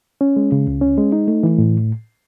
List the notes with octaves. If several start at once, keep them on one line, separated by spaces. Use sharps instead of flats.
C#4
G#3
C#3
C#2
C#4
G#3
D#4
A3
E3
A2